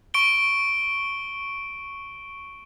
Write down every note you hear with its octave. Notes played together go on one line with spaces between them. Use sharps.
C#6 D7 G7